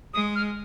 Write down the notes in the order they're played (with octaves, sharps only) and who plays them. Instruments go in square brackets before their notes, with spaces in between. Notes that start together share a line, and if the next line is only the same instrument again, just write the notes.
[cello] G#3 [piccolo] D#6
[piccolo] F6